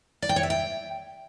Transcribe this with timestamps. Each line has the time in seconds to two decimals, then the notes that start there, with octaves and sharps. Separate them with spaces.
0.22 D5
0.29 G5
0.36 C#5
0.43 E5
0.50 G5